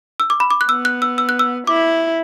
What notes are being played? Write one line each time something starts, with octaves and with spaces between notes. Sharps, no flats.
E6
D6
B5
D6
F#6
B3 E6
F#6
E6
E6
F#6
E6
E4 D6